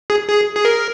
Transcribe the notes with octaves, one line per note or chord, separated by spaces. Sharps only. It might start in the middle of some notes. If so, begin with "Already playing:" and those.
G#4
G#4
G#4
A#4